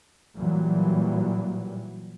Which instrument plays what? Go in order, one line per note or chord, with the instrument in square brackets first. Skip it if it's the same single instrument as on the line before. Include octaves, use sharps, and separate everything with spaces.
[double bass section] A#2 E3 F#3 G3